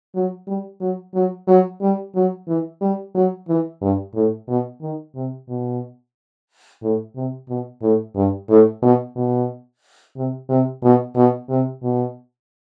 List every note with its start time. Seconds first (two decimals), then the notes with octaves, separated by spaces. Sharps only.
0.15 F#3
0.47 G3
0.81 F#3
1.15 F#3
1.48 F#3
1.82 G3
2.15 F#3
2.48 E3
2.82 G3
3.15 F#3
3.48 E3
3.82 G2
4.15 A2
4.48 B2
4.81 D#3
5.15 C3
5.49 B2
6.82 A2
7.15 C3
7.49 B2
7.82 A2
8.16 G2
8.49 A2
8.82 B2
9.16 B2
10.16 C3
10.49 C3
10.83 B2
11.16 B2
11.49 C3
11.83 B2